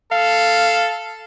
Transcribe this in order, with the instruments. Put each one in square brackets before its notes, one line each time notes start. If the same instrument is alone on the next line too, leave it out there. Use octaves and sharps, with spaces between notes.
[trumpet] A4 [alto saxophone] F5